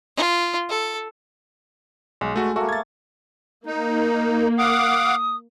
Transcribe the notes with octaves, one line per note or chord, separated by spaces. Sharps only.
F4
A4
B1 G#3
A3 F#4
A3 A#3 F#4
G#6 A6
A#3 D#4
F5 F#5 D6 D#6